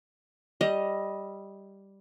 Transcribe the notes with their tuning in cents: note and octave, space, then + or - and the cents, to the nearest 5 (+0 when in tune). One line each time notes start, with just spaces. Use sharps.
G3 +0 D#5 +10